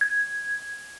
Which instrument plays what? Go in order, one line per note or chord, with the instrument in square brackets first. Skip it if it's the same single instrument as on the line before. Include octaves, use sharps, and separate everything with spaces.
[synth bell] G#6